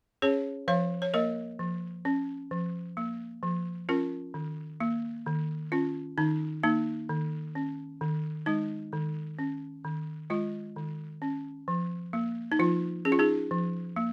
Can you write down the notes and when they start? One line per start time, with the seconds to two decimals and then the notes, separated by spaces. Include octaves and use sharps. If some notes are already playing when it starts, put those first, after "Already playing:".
0.22 C#4 G#4 C#5
0.68 F3 C#5 F5
1.02 C#5
1.14 A#3 A#4 D#5
1.59 F3
2.05 C#4
2.51 F3
2.97 A#3
3.43 F3
3.89 C#4 F4 A#4
4.34 D#3
4.80 A#3
5.26 D#3
5.72 C#4 F4
6.18 D#3 D#4
6.63 A#3 D#4
7.09 D#3
7.55 C#4
8.01 D#3
8.46 G#3 D#4
8.93 D#3
9.39 C#4
9.84 D#3
10.30 G#3 F4
10.76 D#3
11.22 C#4
11.68 F3
12.13 A#3
12.52 D#4
12.59 F3 F4
13.05 C#4 G#4
13.12 F4
13.19 D#4 G#4
13.51 F3
13.96 A#3